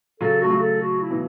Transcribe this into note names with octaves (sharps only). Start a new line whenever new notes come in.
C#3 F#3 A4
A3 F#4
C#3 F#3
A4
F#4
E4
B2 E3